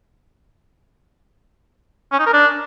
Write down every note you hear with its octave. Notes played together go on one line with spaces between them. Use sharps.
C#4
D#4
A#4
D4